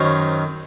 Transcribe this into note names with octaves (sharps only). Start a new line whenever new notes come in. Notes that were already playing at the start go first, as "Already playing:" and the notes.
Already playing: F#2 D#3 F#3 C5